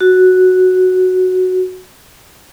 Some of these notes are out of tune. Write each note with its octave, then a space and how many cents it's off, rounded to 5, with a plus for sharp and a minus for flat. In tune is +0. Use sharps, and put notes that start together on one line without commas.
F#4 +0